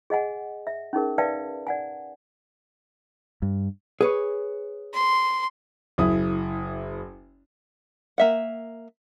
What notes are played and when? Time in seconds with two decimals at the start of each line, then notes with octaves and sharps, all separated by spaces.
0.10 G#4 D#5 F#5 G#5
0.67 E5
0.93 C#4 D#4 G#4 A#4
1.18 B4 D5 E5 F5 G5 A5
1.67 D5 F#5 G#5
3.42 G2
4.01 G#4 B4 C#5
4.94 C6
5.98 F#1 E4 D#6
8.18 A#3 E5 F#5